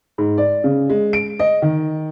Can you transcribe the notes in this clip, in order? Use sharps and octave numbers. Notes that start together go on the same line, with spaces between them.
G#2
D5
C#3
G#3
D7
D#5
D#3